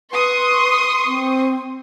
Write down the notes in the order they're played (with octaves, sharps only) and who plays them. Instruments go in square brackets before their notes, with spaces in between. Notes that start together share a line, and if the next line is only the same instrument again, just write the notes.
[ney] B4 [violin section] C6 C#6 D#6
[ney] C4